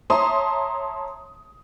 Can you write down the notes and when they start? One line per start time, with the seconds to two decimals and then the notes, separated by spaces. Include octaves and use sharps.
0.10 C#5 E5 A5 A#5 C6 D#6